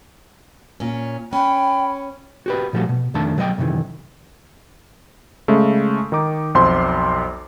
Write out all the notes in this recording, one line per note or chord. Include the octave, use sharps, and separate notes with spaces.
A#2 C#4
C#4 G5 B5
F#4 G4 B4
A#2 F3 G3 A3 F#4
B2
F2 D#3 A3 D4 A5
B1 F#3 A#4 D#5 G5
F#2 C3 D#3 E3
C#3 G#3 A3
D#3 D#4 D6
B1 F2 C5 C6